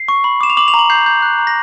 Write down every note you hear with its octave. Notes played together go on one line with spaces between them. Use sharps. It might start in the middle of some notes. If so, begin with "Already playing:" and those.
Already playing: C7
C#6
B5
D6 E7
F7
D6 F#7
F7
A#5
F#7
G6 C7
G6
F#6
A#5
A#6